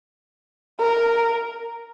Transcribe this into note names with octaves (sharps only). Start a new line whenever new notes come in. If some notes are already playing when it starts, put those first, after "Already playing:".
A#4